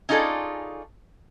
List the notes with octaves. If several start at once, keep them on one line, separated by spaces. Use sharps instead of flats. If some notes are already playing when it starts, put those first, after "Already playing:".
C#4 D#4 F4 G#4 A4 D5